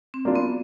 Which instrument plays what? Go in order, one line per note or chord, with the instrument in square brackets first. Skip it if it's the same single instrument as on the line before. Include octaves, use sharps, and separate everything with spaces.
[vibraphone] C4
[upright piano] F#3 A#3 D4 F4
[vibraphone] B3